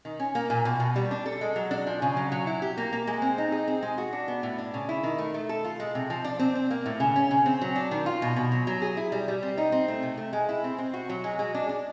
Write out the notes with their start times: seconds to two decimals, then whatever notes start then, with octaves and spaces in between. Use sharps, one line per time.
0.05 D#3
0.20 C#4
0.35 A#3
0.50 A#2
0.65 B2
0.80 B2
0.96 G3
1.11 D4
1.26 A4
1.41 G#3
1.56 F#3
1.71 D4
1.87 F3
2.02 C#3
2.17 F#3
2.32 F#3
2.47 E4
2.62 G4
2.77 A#3
2.93 A#3
3.07 G#3
3.22 C4
3.38 D#4
3.52 G#4
3.68 C4
3.82 G#3
3.98 F#4
4.13 D4
4.28 B3
4.43 A2
4.58 D4
4.74 C#3
4.89 E4
5.03 D#3
5.18 A3
5.34 A3
5.49 A4
5.64 F4
5.80 G#3
5.95 C3
6.10 F3
6.24 D4
6.39 C4
6.55 C4
6.70 A#3
6.86 A2
7.00 C#3
7.16 C#4
7.31 C#3
7.46 C4
7.61 F#3
7.76 D4
7.91 D#3
8.06 F4
8.22 B2
8.36 B2
8.52 F#3
8.67 F#3
8.82 G#4
8.97 E4
9.12 G3
9.28 G3
9.42 C4
9.58 D#4
9.72 C4
9.88 A3
10.03 C3
10.18 A3
10.33 G#3
10.49 E4
10.64 C4
10.78 C4
10.94 F#4
11.09 F#3
11.24 G#3
11.39 G#3
11.54 D4
11.69 D4